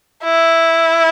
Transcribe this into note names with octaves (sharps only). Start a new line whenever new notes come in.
E4